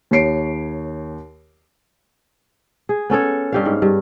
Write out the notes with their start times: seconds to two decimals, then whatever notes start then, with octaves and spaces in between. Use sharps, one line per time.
0.11 D#2 C#5 C7 D7
2.89 G#4
3.10 B3 C#4 A4 C#5
3.52 G2 G4 F5
3.65 G#2
3.82 G2